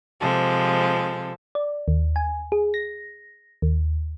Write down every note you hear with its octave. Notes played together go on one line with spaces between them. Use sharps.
C3 F3 G#3 A4
D5
D#2
G#5
G#4
A#6
D#2